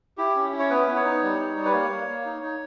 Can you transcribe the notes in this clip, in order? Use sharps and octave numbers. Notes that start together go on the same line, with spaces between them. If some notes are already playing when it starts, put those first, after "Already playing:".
E4 G4
C#4
E4
C#5
B3 B4
B3
C#5
D#4
G3
D#4
G3
B4
A#3 C#5
A#3
A#3
D#4
D#4